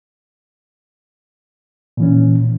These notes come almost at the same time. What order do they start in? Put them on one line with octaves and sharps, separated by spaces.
A#2 E3 C#4